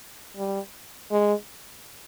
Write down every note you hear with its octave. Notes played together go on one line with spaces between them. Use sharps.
G3
G#3